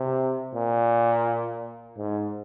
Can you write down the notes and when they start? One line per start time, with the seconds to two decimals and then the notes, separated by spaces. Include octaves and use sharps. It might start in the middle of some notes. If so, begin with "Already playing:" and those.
Already playing: C3
0.55 A#2
1.97 G#2